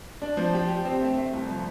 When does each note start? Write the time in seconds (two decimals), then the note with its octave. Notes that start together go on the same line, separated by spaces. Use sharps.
0.22 D4
0.37 F3
0.54 G4
0.69 G4
0.85 C4
1.01 A3
1.17 A3
1.33 C2
1.49 F3